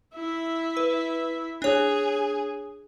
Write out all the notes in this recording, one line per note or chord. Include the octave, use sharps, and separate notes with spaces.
E4 E5
B4
D4 G#4 C#5